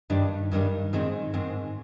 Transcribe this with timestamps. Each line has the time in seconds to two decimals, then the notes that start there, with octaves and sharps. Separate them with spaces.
0.10 G2 D#3 G3 D4
0.52 G2 D#3 G3 D4
0.93 G#2 D#3 G#3 C4
1.34 G#2 D#3 G#3 C4